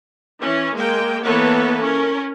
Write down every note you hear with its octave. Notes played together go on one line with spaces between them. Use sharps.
E3 C#4
G#3 A#3 G5
E3 A#3 B3 A4 B4 C#5
C#4 A#4